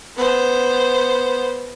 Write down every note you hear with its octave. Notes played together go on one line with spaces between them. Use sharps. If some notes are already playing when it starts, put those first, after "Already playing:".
B3 C5